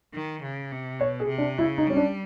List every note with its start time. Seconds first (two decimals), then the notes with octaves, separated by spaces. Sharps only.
0.14 D#3
0.43 C#3
0.72 C3
1.00 B2 C#5
1.20 G#4
1.29 C3
1.38 D4
1.58 C#3 E4
1.78 D#4
1.87 G3 C#4
1.97 D4